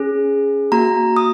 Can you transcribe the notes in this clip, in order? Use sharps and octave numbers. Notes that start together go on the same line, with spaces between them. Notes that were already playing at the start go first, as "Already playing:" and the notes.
Already playing: C#4 G#4
A#3 F#4 A#5
D#6